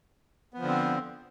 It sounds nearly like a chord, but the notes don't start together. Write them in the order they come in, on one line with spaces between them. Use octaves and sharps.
B3 F3 D3 C4